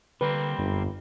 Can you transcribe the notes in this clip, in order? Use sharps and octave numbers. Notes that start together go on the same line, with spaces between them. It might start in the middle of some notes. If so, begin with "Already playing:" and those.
D3 G3 A#3 C4 B4
G1 F#2